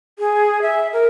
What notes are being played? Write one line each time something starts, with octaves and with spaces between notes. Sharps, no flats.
G#4
E5
A#4